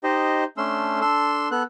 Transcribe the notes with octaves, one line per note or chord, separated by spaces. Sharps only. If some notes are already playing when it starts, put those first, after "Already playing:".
D#4 G4 C5 D#5
A3 C#4 D4 C6 E6
D4 A4 C6 E6
B3 A4 F#6